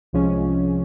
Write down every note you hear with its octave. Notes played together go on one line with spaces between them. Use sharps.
C2 C3 F3 G#3 C#4